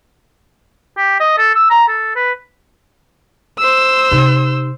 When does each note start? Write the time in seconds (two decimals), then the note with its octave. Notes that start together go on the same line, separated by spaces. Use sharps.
0.97 G4
1.20 D#5
1.38 A4
1.55 E6
1.70 A#5
1.88 A4
2.16 B4
3.59 C5 E6
4.11 C3 D#4